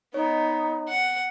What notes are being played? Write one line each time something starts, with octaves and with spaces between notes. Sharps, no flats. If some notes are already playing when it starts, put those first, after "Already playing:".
B3 D#4 C#5 D#5
F#5